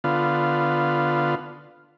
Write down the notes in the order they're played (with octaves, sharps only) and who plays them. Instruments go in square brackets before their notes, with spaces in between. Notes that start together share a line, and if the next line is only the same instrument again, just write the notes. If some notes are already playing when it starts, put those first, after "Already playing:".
[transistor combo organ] D3 B3 F4